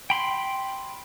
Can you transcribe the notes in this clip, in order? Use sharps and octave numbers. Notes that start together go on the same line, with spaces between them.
G5 B5 C6